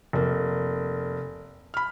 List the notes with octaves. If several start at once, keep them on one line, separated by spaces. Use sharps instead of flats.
F1 A#3
B5 F6